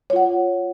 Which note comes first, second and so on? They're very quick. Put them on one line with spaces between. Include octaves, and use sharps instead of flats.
C#5 F4 F#5